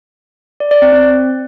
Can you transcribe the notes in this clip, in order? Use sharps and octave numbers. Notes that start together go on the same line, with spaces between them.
D5
D5
C4
C4